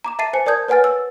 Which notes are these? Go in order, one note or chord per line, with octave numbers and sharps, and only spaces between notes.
A#5 D6 E7
E5 A5 A6 C7 D#7
C5 G#5 C#7
A#4 D5 A5 D#6 G6 G#6
B4 C#5 F#5 G#5 F6 A6
E6